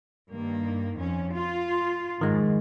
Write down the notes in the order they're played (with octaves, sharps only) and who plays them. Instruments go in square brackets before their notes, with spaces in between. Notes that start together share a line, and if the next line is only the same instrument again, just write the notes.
[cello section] G2 D#3 A#3
F2 C#4
F4
[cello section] F2 G#2 [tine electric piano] D#3 G#3